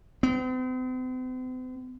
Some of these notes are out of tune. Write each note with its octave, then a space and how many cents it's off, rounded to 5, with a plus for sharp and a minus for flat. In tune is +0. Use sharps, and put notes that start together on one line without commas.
C4 -45